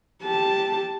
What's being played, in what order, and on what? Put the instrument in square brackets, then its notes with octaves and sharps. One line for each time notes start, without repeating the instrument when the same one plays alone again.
[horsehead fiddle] G4 A5